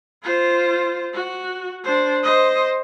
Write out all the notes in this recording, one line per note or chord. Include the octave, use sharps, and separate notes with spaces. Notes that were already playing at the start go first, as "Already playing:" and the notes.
F4 C5
F#4
D4 C5
C5 D#5